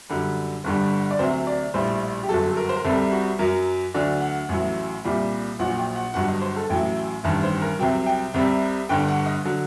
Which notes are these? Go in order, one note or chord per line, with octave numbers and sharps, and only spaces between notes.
F#2 D3 G3
G1 G2 D3 G3
D5
D2 C3 F#3 C5
D5
A#1 A2 G3 C5
G4
G1 F#2 F#3 A4
A4
A#4
C5
A#4
C2 C3 G3 A4
F#4
F#2 F#3 A#4
D2 D3 F#3 D5
F#5
A1 A2 F#3
C2 A#2 G3
A#1 A#2 F#3 F#5
G5
F#5
G1 G2 F#3 F#5
D#5
C5
A4
A1 A2 F#3 G5
A1 G2 D#3 A5
C5
A#4
C2 C3 F#3 G5
G5
C2 C3 G3
G1 G2 D3 G5
F#5
D#5
D3 F#3